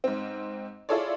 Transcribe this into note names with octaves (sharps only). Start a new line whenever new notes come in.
G#2 C4
E4 F4 G#4 A4 C#5 D5